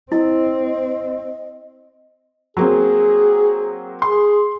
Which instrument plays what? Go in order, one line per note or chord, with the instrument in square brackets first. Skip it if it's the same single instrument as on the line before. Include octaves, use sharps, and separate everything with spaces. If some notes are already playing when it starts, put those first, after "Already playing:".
[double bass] C4 [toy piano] E4 [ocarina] D#5
[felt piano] F#3 A#3 C4 [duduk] G#4
[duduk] G#4 [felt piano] C6